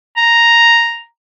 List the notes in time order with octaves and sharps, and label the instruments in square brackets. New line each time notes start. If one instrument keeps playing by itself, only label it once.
[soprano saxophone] A#5